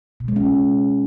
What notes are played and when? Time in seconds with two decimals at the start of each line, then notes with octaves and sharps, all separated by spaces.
0.20 B2
0.28 G#3
0.36 C#4